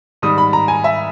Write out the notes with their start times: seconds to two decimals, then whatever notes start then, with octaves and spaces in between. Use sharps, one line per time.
0.22 G#2 D#3 G3 D#6
0.38 B5
0.53 A#5
0.68 G#5
0.84 E5